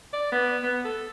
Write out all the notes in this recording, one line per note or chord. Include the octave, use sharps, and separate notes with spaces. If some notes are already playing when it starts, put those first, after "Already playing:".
D5
B3
B3
A4